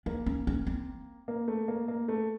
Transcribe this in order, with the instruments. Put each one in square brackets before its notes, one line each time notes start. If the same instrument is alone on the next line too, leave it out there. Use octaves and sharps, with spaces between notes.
[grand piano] A#3 [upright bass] D4
[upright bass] C#4
C#4
C4
[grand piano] A#3
A3
A#3
A#3
A3